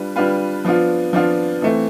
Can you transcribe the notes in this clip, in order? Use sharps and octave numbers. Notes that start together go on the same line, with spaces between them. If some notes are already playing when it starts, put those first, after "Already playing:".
Already playing: G3 D4 F4 B4
G3 D4 F4 B4
F3 B3 D4 F4
F3 B3 D4 F4
E3 A3 C4